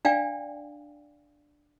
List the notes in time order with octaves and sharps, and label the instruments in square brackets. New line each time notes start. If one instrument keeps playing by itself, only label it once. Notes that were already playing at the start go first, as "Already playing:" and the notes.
[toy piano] D4 D5 F5 G5 G#5